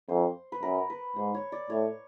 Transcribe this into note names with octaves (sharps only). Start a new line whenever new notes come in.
F2 C5
B4
F#2 A#4
B4
G#2 C5
C#5
D5
A2 C#5